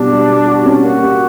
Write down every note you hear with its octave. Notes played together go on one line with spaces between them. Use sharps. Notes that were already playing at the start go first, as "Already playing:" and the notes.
Already playing: B2 G3 D4
G3
G3
F#4
C#4
A#3 F#4
G4